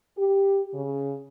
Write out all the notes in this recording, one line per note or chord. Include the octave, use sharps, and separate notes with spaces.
G4
C#3